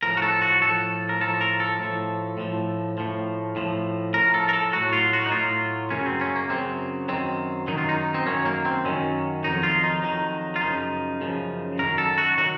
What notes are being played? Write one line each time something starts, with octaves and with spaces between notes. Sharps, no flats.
A2 F3 A#4
F#4
A4
F#4
A2 F3 A4
A#4
A2 F3 A4
A#4
A4
A2 F3
A2 F3
A2 F3
A2 F3
A2 F3 A#4
A4
A#4
A4
A2 F#3 F#4
F4
F#4
D#4
A2 F#3 F4
F#2 C#3 F#3 C#4
C4
C#4
A#3
F#2 C#3 F#3 C4
F#2 D#3 F#3 C4
F#2 D#3 F#3 D#4
F4
D#4
C4
F#2 D#3 F#3 C#4
A#3
C4
F#2 D#3 F#3 C#4
F2 D#3 F#3 D#4
F4
D#4
F2 D#3 F#3 D#4
F4
F#2 C#3 F3 D#4
F#2 C#3 F3
F#2 D#3 F#3 A#4
A4
F#4
D#3 F#3 F#4